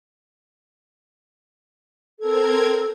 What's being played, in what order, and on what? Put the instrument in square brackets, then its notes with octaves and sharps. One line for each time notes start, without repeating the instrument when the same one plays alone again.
[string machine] C4 A#4 G#6 [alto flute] A4